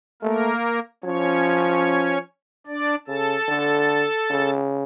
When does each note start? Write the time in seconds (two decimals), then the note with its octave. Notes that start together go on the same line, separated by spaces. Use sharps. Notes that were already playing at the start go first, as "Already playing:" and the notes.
0.22 A3 A#3 A#4
1.04 F3 C#4 C#5
2.67 D4 D5
3.08 C#3 A4 A5
3.48 D3
4.30 C#3